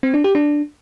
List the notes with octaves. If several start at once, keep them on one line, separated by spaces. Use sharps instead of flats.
C4
D4
G4
D4